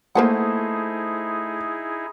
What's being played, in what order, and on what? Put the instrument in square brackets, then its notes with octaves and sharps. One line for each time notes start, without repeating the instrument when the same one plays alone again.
[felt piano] A3 C5 [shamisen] A#3 B4 F#5 [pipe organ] D#4 E4 G#4